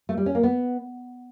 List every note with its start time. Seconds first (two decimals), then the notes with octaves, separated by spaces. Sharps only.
0.09 A3
0.18 G3
0.26 C#4
0.35 A#3
0.43 B3